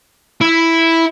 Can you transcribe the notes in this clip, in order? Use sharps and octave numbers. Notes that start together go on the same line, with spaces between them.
E4